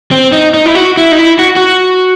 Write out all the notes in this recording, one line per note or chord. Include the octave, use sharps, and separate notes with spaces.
C4
D#4
D#4
E4
F#4
E4
D#4
E4
F#4
F#4